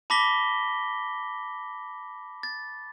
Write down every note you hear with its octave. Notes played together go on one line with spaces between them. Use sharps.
A5 B5 D6 A#6 B6 G7
A6